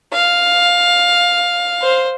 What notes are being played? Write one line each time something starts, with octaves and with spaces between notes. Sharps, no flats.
F5
C5